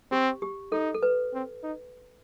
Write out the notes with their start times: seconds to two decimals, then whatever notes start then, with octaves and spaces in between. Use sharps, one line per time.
0.11 C4 G4
0.42 G4
0.72 D#4 A4
0.94 A4
1.03 B4
1.34 C4
1.63 D#4